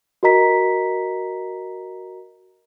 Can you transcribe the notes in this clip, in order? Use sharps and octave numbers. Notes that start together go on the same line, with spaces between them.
F#4 A#4 D#5 A#5 B6